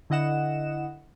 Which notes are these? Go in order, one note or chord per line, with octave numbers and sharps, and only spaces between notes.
D3 E4 D#5 F#5 E7